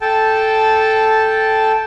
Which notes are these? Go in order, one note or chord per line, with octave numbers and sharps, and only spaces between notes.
A4 G5 A5